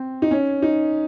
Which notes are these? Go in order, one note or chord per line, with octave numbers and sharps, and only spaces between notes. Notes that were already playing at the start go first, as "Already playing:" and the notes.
Already playing: C4
D#4
C#4
D#4